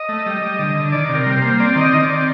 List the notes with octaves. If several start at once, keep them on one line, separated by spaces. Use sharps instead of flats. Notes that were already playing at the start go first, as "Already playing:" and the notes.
Already playing: D#5
A3
G3
G3
D3
D3
D#3 D5
C3
A#4
G3
C5
A#3
C4 D5
D#3
D#5
D#3
D5
C4